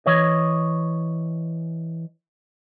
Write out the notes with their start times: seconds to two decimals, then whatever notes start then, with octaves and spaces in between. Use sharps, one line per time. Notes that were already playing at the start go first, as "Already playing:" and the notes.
0.06 E3 C#5 D#5